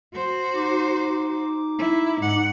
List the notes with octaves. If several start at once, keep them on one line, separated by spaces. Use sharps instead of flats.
F#4 C5
D#4 D6
E4
G#2 F#5